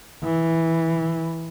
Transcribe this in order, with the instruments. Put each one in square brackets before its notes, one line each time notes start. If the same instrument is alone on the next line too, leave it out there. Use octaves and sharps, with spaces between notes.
[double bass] E3